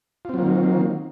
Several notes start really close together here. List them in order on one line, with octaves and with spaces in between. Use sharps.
F4 C4 F#3 A#3 D#3